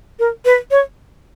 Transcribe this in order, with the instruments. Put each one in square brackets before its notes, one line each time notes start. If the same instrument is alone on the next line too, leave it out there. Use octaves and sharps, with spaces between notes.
[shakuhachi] A#4
B4
C#5